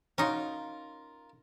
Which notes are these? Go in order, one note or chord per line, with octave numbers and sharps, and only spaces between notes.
C#4 D#4 F4 F#4 A#4